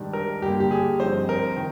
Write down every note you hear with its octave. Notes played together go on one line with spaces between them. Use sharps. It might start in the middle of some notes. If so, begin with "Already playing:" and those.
Already playing: G#2 D#3 G3 D4
A#4
G2 D3 G3 A#3 G4
G4
G#4
G2 F3 C4 D#4 C5
A#4
D#3